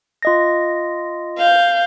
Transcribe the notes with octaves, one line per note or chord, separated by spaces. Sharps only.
F4 D#5 A#6
F5 G6